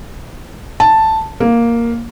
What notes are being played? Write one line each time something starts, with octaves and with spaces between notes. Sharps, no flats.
A5
A#3